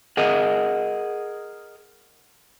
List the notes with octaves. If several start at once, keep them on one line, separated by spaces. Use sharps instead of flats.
G#4 A#4 D#5 F#5